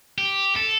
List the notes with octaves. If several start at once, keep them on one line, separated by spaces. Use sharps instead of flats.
G4
A4